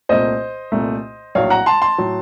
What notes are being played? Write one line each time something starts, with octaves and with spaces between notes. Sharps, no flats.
C2 A#2 A3 C5 D#5
C2 A#2 A3
A#1 A2 F#3 C#5 F5
F#5 A#5
A5 C6
A5 C6
A2 F#3